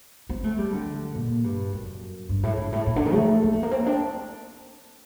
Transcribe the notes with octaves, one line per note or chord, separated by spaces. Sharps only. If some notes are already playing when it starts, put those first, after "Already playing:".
C4
A3
G3
D3
A#2
G2
F#2
G2
A2
G2
A2
A#2
D3
D#3
A3
A#3
A3
A#3
C4
D4